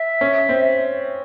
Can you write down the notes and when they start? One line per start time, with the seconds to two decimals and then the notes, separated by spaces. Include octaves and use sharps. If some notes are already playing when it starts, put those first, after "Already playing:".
Already playing: E5
0.21 C#4
0.49 C4